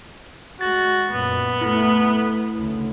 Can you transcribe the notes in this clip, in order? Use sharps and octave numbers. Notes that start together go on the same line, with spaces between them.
G#3 F#4 A6
F#2 A#2 B3
A3 E4
D2 C#3